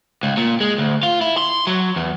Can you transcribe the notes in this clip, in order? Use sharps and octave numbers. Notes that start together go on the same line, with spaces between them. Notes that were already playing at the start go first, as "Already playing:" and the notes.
C#2
A#2
G#3
D2
F4
E4
C6
F#3
E2